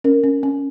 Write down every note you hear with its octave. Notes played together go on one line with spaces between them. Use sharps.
C#4 A#4
C#4
C#4